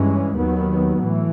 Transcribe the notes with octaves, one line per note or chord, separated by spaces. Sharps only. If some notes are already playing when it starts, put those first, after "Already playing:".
Already playing: G2 E3 G#3 C#4
D#2 D#3 F#3 B3
A2 E3